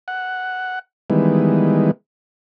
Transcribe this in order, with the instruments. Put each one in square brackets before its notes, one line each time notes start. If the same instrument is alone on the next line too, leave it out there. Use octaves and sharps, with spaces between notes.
[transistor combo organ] F#5
D#3 E3 G3 G#3 B3